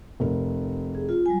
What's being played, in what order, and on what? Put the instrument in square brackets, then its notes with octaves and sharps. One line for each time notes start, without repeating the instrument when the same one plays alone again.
[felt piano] F1 A#4
[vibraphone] G#4
F4
F#3 G3 G#5